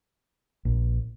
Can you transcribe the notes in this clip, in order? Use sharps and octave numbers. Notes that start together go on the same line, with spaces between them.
A#1